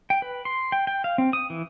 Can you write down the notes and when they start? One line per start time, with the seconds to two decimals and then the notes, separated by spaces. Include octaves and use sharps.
0.10 G5
0.22 B4
0.45 C6
0.72 G5
0.87 G5
1.04 F5
1.18 C4
1.33 D#6
1.50 E3